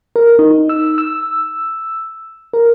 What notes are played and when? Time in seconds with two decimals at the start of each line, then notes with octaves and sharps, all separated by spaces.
0.16 A#4
0.39 D#4
0.69 E6
0.98 E6
2.53 A#4